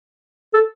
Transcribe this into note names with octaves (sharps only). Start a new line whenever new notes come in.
A4